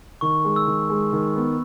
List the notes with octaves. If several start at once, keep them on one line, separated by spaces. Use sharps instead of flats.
D#3 C#6
G#3
E6
D#3
G#3
D#3
B3